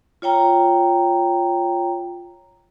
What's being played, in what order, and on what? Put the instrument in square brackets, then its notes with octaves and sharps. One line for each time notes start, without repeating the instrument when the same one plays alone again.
[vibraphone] F4 C#5 G5 A#5